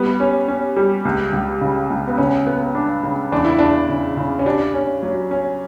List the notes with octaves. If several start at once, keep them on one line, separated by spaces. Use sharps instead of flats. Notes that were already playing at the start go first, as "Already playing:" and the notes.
Already playing: G3 B3
C#4
C#4
G3
C#2
C#2
C#3
C#2
B3
C#3 C#4
B3
D4
C#3
E2 D4
E4
E2 D4
C#3
C#3
C#4
D4 G4
C#4
F#3
C#4